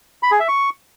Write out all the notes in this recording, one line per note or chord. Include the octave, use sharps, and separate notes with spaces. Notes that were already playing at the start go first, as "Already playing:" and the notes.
B5
G#4
E5
C#6